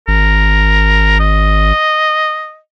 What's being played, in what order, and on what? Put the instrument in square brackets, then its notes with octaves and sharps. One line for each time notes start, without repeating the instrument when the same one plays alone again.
[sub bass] G#1 [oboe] A#4
[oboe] D#5